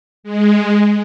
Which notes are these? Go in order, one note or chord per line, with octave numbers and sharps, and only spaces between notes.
G#3